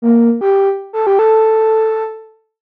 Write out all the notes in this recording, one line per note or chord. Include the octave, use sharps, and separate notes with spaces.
A#3
G4
A4
G4
A4